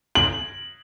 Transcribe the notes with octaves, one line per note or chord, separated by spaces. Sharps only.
F#7